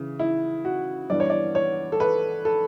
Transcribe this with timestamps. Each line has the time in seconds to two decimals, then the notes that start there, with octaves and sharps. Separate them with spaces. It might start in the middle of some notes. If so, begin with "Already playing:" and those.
Already playing: C#3 E3
0.19 E4
0.65 F#4
1.10 G2 E3 B3 D5
1.20 C#5
1.30 D5
1.55 C#5
1.92 A4
2.00 B4
2.45 A4